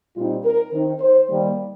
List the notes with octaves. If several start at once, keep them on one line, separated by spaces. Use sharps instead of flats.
A#2 G3 C4 D#4 F4
A#4
D#3 C4 D#4
C5
D#3 G3 A#3